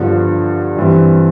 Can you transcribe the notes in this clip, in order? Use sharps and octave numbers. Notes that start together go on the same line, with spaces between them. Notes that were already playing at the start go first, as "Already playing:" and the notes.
Already playing: G1 G2 D3 F3
G2 E3 G3 C4